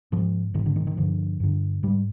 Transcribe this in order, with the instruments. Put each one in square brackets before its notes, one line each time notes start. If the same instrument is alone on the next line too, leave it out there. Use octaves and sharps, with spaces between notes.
[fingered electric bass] G#2 F3
G#2 D#3
D3
D#3
D#3
G2 D3 F3
G2 D3
G#2 G3